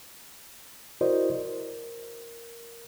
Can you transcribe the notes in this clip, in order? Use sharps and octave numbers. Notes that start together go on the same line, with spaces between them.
E4 F#4 A#4 C5 D5 D#5
A#4